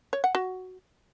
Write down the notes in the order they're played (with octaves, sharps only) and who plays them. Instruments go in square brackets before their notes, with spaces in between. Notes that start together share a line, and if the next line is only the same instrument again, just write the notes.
[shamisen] C#5
F#5
F#4